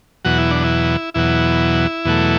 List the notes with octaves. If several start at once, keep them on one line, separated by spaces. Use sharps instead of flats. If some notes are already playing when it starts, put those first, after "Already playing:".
E2 B2 F#3 F#4
E4
D4
E4
E2 B2 F#3 E4
E2 B2 F#3 A3